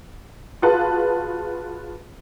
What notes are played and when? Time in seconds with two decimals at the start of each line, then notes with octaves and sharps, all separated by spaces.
0.62 F4 F#4 G#4 B4 A5